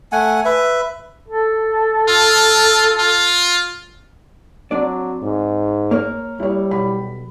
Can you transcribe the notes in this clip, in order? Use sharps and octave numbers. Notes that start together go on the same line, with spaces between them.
A3 F#5 G#5
B4 E5
A4
F4
F4
F#3 C4 D4 D5
G#2
A#3 A#4 C#5
G3 E4 C#5
B1 B5